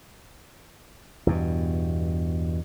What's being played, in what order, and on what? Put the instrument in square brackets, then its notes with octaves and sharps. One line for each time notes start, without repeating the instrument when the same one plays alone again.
[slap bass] E2 G2 B2